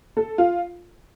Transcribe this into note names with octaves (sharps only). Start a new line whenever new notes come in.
A4
F4